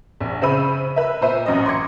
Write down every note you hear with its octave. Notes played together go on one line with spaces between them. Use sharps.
A#1
C#3 C5 E5 B5 E6 D#7
B4 E5
A#2 C5 E5 D#7
A1 F#2 D#5
C6 D6 G#6 C#7